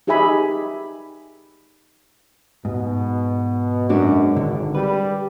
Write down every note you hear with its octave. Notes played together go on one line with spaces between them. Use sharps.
D#4 G4 G#4 E5 G#5 B5
G#2 B2
F#2 G#3 D4 F#4
G#1 D3
G3 B4